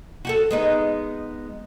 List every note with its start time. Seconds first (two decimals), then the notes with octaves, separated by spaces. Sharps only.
0.25 F#4 G4 A4
0.51 G#3 B3 D#4